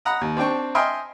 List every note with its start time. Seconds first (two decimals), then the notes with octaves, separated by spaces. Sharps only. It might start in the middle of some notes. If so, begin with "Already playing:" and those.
0.05 F#5 A#5 B5 D#6
0.21 D#2
0.37 C4 D4 G5 C#6
0.75 D#5 E5 G5 G#5 C6 F6